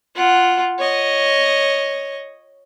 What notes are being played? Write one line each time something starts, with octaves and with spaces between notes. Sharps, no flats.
F4 F#5
C#5 D#5